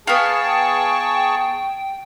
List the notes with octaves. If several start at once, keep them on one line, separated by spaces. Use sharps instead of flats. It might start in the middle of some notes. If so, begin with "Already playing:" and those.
B3 G#4 F5 G5 A5 C#6